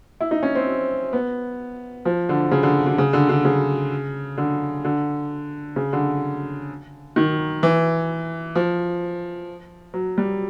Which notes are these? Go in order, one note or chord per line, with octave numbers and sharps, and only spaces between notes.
E4
D#4
C#4
C4
B3
F3
D3
C#3
D3
D3
C#3
D3
D3
C#3
D3
D3
C#3
D3
D#3
E3
F3
F#3
G3